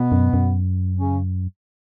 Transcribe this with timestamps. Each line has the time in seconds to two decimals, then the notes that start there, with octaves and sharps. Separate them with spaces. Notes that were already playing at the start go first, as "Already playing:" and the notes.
Already playing: B2 B3
0.12 F#2
0.34 F#2
0.96 C#3 C#4